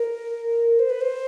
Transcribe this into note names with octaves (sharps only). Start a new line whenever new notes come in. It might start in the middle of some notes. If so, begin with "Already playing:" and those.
Already playing: A#4
C5
B4
C5